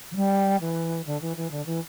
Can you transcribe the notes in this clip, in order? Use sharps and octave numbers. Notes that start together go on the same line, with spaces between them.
E3
G3
E3
D3
E3
E3
D3
E3